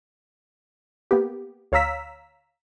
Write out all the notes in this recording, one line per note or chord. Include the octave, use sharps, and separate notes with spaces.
A#3 B3 G4
D2 C#5 F5 A#5 E6 B6